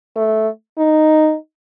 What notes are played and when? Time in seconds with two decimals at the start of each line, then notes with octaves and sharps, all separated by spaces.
0.16 A3
0.78 D#4